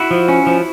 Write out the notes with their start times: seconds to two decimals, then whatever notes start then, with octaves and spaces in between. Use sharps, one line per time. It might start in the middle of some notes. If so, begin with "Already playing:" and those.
Already playing: E4 F#4
0.11 F3
0.29 C#4
0.47 F3